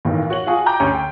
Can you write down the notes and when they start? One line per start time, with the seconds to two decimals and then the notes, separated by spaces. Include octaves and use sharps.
0.05 B1 A2 D#3 E3
0.30 F#4 C#5 F#7
0.47 F4 F#4 G#4
0.66 G5 A#5 D6 G6
0.80 D2 C#4
0.95 G5